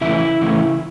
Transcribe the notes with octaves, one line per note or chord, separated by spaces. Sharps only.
C#3 E3 A3 E4 E5
C#3 E3 A3